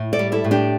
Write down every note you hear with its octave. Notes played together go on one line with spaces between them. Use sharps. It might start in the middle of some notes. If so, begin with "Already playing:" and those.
Already playing: A2
A4 D5
G3
E4 A4
A2
D4 G4